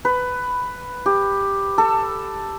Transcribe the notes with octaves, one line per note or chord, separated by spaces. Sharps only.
B4
G4
A4